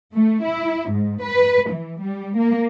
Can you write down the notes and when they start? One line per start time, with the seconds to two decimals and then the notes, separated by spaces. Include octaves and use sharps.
0.13 A3
0.43 E4
0.90 G#2
1.23 B4
1.71 E3
2.01 G3
2.37 A#3